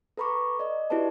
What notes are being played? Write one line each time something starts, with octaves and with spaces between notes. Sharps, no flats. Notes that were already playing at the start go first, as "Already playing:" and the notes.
A4 B4 A#5 B5 C#6 D6
D5 D#5
E4 F#4 G4 B4 D5 A5